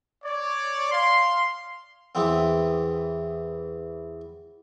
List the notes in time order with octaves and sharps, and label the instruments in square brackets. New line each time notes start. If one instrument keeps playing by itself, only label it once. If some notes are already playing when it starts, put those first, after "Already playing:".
[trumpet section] C#5 D5
F5 C6
[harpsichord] E2 E3 B3 C4